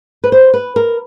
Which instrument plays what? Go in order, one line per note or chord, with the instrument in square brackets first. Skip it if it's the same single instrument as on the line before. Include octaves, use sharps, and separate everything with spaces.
[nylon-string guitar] B4
C5
B4
A#4